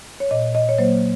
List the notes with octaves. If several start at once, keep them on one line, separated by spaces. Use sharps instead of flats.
C#5
A#2 D#5
D#5
C#5
F#3 A#3 C5